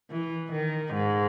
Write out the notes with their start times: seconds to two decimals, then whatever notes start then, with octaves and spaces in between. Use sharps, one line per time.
0.11 E3
0.52 D#3
0.94 G#2